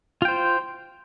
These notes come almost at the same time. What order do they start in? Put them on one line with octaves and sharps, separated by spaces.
F4 G5 C5